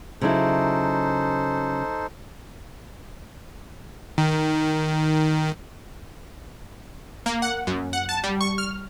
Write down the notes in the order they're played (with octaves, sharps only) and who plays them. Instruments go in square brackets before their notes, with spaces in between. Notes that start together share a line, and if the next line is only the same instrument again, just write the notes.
[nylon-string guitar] C#3 F#3 E4 [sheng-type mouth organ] D#4 A4 C5
[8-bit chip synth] D#3
[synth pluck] A#3
F#5
F#2
F#5
A5
G3
C#6
F6